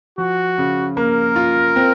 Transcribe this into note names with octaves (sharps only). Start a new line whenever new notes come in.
F3 F#4
C#3
A#3 A#4
F4
C4